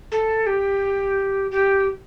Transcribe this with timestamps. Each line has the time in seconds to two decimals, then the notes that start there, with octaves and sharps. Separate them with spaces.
0.12 A4
0.47 G4
1.51 G4